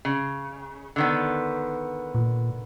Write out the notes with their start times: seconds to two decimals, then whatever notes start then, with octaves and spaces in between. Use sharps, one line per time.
0.05 C#3
0.96 D3 D#3 B3
2.15 A#2